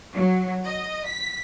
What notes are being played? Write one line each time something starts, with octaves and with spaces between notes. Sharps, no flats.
F#3
D#5
B6